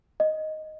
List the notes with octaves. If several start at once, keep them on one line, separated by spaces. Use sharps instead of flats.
D#5